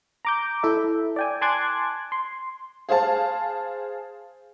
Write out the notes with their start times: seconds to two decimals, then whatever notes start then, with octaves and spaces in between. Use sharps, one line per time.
0.25 A#5 D6 G6
0.63 E4 A4 E5
1.16 D5 G5 G#5
1.41 G#5 A5 C6 D6 F#6 G#6
2.12 C6
2.89 G#4 C5 F5 A5